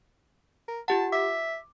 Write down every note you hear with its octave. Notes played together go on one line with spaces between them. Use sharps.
A#4
F4 G4 F#5 A5
E5 D6